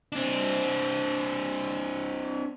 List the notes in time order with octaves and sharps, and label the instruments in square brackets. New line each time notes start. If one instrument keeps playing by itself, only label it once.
[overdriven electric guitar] C4 D4